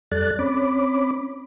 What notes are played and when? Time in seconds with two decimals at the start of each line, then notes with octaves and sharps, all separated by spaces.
0.12 F2 G3 A4 D5 F#6 A6
0.39 C4 C#4 C#5 B5 D6